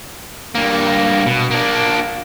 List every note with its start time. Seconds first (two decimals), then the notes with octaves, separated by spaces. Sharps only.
0.55 G2 A#3
1.26 B2
1.51 A#3 D4